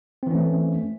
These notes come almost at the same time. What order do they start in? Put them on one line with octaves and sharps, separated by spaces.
C4 E3 C#4 A3